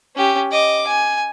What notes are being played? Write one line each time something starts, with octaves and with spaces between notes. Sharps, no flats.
C#4 G4
D#5 D6
G#5